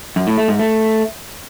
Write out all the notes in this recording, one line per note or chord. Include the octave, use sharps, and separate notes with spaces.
F#2
A2
A3
G#2
A3